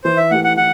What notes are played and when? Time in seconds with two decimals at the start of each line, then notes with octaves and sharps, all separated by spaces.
0.04 E3 C5
0.17 E5
0.30 A3 E4 G4 F#5
0.44 F#5
0.57 E3 F#5